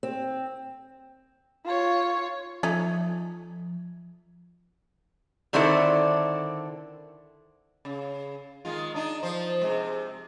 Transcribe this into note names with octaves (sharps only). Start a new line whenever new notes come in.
C4
F4 C#5
F3 A3 C#4 D#4
D3 D#3 C4 D4 E4 A4
C#3
D#3 G#3 F4
D4 D#4
F3 C5
C3 G#3